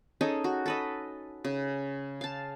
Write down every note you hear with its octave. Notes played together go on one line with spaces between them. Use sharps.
C#4 D#4 G#4 A4
F#4
A4 B4 D#5
C#3
F5 A5